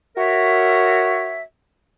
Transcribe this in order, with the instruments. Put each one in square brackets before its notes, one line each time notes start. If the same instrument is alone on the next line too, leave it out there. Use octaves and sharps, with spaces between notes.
[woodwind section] F#4 A#4 C#5 E5